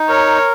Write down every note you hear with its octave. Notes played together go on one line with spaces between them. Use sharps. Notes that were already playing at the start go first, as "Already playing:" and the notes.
Already playing: D#4
A#4 C#5